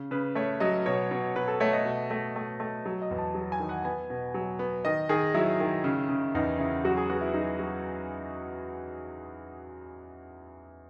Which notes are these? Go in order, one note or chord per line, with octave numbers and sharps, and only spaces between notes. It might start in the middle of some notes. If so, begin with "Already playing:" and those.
Already playing: C#3
C#3 B4
A3 C#5
F#3 D#5
B2 C#5
B2
B2 B4
A4
A3 C#5
D#5
B2
A3
A3
A3
F#3
D#5
E2
A5
F#3
G#5
D#3
F#5
B3 G#5
B2
F#3
B3
D#3 D#5
D#3 G#4
F#3 E4
D#3
C#3
C#3
E2 D#4
C#3 E4
F#3 F#4
G#4
B3 F#4
E4
F#3 D#4
F#3